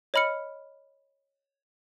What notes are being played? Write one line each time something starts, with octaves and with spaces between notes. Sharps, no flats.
C#5 D#5 B5 F6 C#7